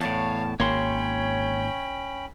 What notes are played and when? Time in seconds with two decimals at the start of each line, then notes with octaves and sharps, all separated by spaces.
0.01 E2 A2 C#5 F5 A5
0.60 G#1 A#3 C#4 C#5 G5 B5 C6